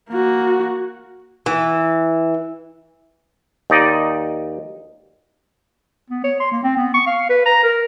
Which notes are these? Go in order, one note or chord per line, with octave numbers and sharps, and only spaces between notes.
A#3 F#4
E3
D#2 D#4 D5 D#5
B3
C#5
C6
A#3
C4
B3
C#6
F5
B4
A#5
A#4